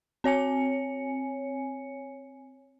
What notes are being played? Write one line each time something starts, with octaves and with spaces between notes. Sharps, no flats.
C4 C#5 G#5 C#7